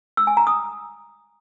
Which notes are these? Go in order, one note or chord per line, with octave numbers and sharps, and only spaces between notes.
E6
G#5
A#5
D#6